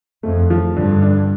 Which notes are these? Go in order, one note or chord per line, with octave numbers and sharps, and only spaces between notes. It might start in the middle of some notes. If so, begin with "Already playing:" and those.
F2 A3
F3
G2 D3
D4